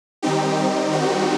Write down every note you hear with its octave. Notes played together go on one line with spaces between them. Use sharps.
D#3 G3 C4 D#4 G4
G4
F#4